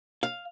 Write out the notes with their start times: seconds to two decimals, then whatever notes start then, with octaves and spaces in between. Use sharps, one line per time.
0.23 F5